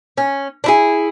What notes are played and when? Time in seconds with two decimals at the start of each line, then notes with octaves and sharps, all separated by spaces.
0.18 C#4
0.64 D4 E4 G#4